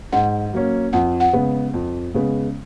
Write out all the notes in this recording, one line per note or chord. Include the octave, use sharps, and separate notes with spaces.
G#2 F#5
F#3 A#3 C#4
F2 F#5
F#5
C#3 G#3 B3
F2
C#3 G#3 B3